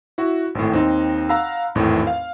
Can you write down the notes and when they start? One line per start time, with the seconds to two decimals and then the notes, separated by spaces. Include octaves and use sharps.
0.18 E4 F#4
0.55 G#1 A2
0.72 D#2 C4 D#4
1.29 F5 F#5 A#5 B5 E6
1.75 G#1 E2 A2
2.07 F5